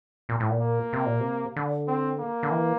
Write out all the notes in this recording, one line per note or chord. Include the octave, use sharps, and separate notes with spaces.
A#2
A2
A#2
A#3
C3
A#2
C3
D3
C4
A#3
D3
E3